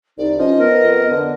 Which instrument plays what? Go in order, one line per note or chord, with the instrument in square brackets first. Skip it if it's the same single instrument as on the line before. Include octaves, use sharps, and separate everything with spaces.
[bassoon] C2 [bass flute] D#4 [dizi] D5
[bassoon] F3 [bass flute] C#4 [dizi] D#5
[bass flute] B3 [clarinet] A#4
[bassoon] F2
D3